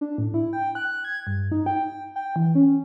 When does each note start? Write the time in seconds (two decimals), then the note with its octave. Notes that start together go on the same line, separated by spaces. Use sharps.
0.01 D4
0.18 A2
0.34 E4
0.53 G5
0.75 F#6
1.04 G#6
1.27 G2
1.52 D#4
1.66 G5
2.16 G5
2.36 E3
2.55 C#4